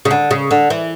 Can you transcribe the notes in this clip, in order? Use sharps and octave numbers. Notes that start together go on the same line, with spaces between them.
C#3
D3
C#3
D3
E3